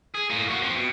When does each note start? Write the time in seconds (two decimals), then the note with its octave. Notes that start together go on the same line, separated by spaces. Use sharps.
0.15 G#4
0.30 A2 A#3
0.48 A#3 F#4
0.62 F3 C4
0.75 B2